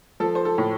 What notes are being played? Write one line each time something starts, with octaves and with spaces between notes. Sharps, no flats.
F3 A4
C5
A4
A2